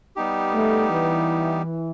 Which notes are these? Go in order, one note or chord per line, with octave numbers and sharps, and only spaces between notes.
G3 B3 D#4 G4
A3
E3